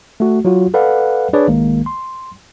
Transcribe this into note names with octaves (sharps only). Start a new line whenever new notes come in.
A3 F#4
F#3 F4 F#4
A4 B4 D5 F5 F#5
D4 G#4 B4 C#5 D5
B1 D#3 G#3 A#3
C6